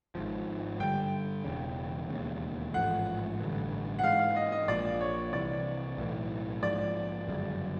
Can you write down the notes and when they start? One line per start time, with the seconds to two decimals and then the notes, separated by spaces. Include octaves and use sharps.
0.15 G#1 G#2 F3
0.80 G2 D3 G3 G5
1.45 E1 E2 C#3
2.09 E1 D#2 C#3
2.74 A1 G#2 F3 A3 F#5
3.39 A1 G2 D3
3.99 F#5
4.03 G#2 E3 G#3 F5
4.20 F5
4.36 D#5
4.52 D#5
4.68 A#1 A#2 F3 D5
5.00 C#5
5.33 C2 C3 E3 D5
5.98 B1 A2 E3
6.63 A#1 G#2 F3 G#3 D5
7.27 G1 F#2 C#3